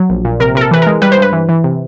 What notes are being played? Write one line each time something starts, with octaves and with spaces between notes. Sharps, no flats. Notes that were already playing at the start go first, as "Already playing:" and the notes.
Already playing: F#3
A#1
A#2
C3 A#4
C3 A#4
A4
E3 B4
G#3 A#4
G3 B4
C5
G2 B4
E3
E3
C3